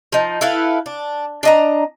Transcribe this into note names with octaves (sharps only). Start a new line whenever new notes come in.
F3 D#4
E4 A4 B4 F5
D4
D4 D#5 A#5